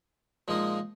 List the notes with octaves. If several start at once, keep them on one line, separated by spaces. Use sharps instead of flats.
A#2 F3 G#3 D#4 A#4